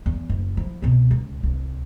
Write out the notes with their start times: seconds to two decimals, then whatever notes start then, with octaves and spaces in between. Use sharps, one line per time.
0.06 E2
0.30 F#1
0.57 F3 E4
0.82 C2 B2
1.11 C#2
1.43 C2